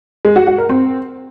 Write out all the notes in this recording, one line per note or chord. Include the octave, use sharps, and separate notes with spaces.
G#3
F#4
F#4
A#4
C4